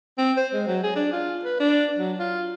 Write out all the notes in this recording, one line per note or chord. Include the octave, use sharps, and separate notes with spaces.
C4
C5
G#3
F#3
G#4
D4
F4
B4
D4
F#3
F4